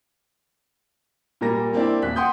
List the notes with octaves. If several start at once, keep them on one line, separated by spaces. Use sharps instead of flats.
A#2 G3 A#4 A#6
A#3 C4 D4 E4
D#1 F#6 B6
F#5 G5 C6 D#6 G6